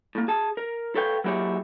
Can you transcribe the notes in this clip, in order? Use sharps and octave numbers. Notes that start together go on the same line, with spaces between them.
A2 A#3
G#4 A5
A#4
A4 B4 C#5 F5 G5
F#3 A#3 E4 G4 G#4 C#5